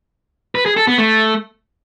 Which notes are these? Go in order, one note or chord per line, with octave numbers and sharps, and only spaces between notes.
B4
G#4
A4
B3
A3